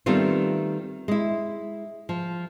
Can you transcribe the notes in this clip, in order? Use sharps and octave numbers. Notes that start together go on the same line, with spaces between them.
D#3 G3 A3 B3 C4 F4
G#3 E4
F3